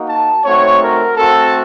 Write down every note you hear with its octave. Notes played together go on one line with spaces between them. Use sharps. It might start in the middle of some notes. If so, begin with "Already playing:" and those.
Already playing: A#3 D#4 F#4
A5
A3 C4 D#4 F#4 C#5
A#4
A3 C4 F#4 A4